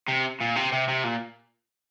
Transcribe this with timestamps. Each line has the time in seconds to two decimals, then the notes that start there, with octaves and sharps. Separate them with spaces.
0.08 C3
0.41 A#2
0.56 C3
0.72 C3
0.88 C3
1.04 A#2